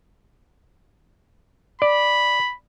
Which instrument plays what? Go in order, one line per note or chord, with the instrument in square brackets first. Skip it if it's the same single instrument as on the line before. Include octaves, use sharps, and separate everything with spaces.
[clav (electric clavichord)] D5 [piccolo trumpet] B5